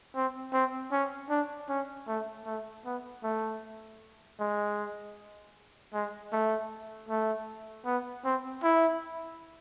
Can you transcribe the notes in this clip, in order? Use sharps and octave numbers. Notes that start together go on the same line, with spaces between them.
C4
C4
C#4
D4
C#4
A3
A3
B3
A3
G#3
G#3
A3
A3
B3
C4
E4